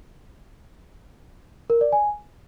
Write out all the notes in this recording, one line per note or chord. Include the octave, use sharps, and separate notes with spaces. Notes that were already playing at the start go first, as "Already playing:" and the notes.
A#4
D5
G#5